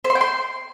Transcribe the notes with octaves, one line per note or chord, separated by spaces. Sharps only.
C5
C6
G5
C6